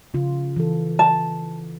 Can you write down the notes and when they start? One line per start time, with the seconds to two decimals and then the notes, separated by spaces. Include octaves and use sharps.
0.14 C#3 F4
0.56 E3 A4
0.99 A5